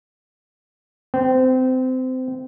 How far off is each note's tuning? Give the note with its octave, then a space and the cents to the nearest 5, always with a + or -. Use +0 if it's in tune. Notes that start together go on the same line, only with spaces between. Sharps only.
C4 -25